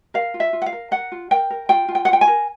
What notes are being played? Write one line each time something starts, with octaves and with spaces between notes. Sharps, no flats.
A#4 F5
F4
E5
F4
F#5
F5
A#4
A#4 F#5
F4
A#4 G5
A#4
F4 G5
F4
G5
F#5
F4 G5
G#5
A#4